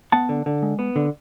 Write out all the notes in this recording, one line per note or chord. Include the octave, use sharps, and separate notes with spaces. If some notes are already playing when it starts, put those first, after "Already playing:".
B3 F#5 A5
D3
D3
G#3
B3
D3